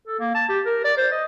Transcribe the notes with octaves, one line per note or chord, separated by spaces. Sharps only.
A4
A#3
A5
G4
A#4
D5
C5
D#5